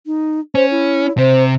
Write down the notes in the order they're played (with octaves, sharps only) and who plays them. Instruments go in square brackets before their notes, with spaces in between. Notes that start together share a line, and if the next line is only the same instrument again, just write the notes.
[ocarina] D#4
[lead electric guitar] C#4 [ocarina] C5
[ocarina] E4
[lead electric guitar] C3 [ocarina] C5